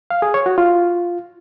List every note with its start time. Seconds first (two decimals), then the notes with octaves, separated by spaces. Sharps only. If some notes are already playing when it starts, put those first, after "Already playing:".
0.10 F5
0.22 G#4
0.34 C#5
0.46 F#4
0.58 F4